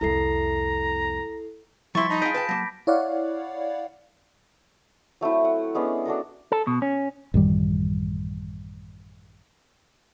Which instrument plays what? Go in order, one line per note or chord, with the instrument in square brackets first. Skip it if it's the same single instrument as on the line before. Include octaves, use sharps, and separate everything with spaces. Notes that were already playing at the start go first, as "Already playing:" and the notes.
[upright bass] C2 F2 [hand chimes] E4 A4 C7 [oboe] A#5
[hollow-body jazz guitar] F3 G3 [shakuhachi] E4 [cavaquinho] C6 C#6 [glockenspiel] A6 B6
[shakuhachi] D#4 [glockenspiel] A5 B5 A#6
[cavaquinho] F4 G#4 [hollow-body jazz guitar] D#5 [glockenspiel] G6 B6 D7
[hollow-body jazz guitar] B4 G5 [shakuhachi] A5
[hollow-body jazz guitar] F#3 A#3 [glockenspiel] D6 A#6
[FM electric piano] E4 C#5 D5 F5 F#5
[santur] F#3 A3 C4 E4
F#5
G#3 B3 C#4 D4
D4 F#4 A4 A#4
[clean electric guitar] A4
B2
C#4
[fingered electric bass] A1 F#2 D#3 G3